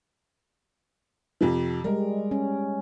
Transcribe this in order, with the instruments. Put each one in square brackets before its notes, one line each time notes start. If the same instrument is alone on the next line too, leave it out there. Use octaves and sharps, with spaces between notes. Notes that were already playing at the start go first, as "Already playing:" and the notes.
[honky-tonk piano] F2 C3 F3
[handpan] G3 G#3 [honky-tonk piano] A#4
[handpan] C#4